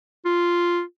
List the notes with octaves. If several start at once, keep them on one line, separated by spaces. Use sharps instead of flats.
F4